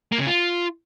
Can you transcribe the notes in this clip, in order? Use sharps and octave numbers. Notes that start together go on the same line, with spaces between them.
A#3
C#3
F4